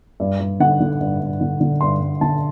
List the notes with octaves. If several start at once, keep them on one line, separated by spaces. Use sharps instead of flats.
G2
G2
D3 F#5
D3
G2
G2
D3
D3
G2 C6
G2
D3 A5